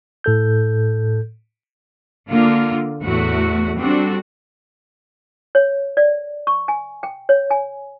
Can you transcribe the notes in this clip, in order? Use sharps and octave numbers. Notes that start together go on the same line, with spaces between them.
A2 A4 G6
D3 A#3 F4
E2 A2 A3 F#4
G3 C4 D4 F#4 A4
C#5
D5
C#6
G#5
G5
C#5
G#5